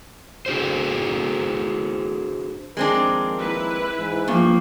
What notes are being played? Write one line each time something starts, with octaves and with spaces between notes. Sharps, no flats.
D4 F#4 G#4 C5
D#2 F3 G#3 C4 D4 A#4
E4 B4
G#2 E3
G2 F3 A#3